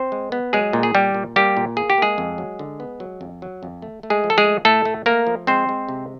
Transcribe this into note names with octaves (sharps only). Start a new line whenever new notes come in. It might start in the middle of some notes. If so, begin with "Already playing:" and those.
Already playing: C4 C5
G#3
B3
F#3 G#3 G#4
A#2
G#4
A#2 G3 G4
A#2
G3 A#3 G4
A#2
A#3 G#4
G4
G#3 A#3 G#4
F2
F#3
D3
B3
F#3
F2
F#3
F2
A3
A3
G#3 G#4
F3
A4
G#3 G#4
A3
A2 A3 A4
A3
A3 A#3 A#4
F3
G#3 C4 C5
G#3
C3